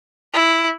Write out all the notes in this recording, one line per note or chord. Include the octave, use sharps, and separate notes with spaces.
E4